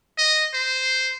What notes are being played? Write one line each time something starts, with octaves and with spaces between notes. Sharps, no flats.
D#5
C5